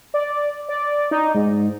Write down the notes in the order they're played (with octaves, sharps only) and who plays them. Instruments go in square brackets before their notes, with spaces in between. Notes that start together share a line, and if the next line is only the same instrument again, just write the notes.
[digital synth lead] D5
D5
D#4
G#2